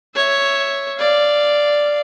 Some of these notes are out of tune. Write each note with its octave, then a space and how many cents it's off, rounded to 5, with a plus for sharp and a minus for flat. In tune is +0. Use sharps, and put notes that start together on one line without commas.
C#5 +0 E5 +0
D5 +0 F5 -15